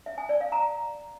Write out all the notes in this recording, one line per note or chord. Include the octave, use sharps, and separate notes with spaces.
E5
G#5
D5
F5
A#5